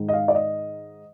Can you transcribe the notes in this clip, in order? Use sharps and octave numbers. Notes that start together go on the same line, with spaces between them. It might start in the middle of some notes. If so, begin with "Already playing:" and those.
Already playing: G#2 D#3 G#3
D#5
F5
D5
D#5